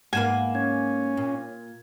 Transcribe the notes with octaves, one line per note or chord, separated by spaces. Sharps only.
G#2 A#3 B3 F#5 G#5 E7
C#4 G#6
A#2